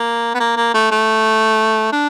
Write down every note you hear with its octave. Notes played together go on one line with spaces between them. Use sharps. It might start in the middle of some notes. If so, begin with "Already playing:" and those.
Already playing: A#3
B3
A#3
A#3
A3
A3
D4